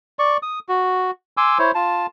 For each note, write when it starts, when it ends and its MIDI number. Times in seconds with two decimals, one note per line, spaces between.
0.19 0.37 74
0.19 0.37 85
0.43 0.59 87
0.69 1.11 66
1.37 1.58 80
1.37 1.58 84
1.37 1.58 86
1.37 1.58 88
1.59 1.71 64
1.59 1.71 72
1.59 1.71 73
1.75 2.06 65
1.75 2.06 81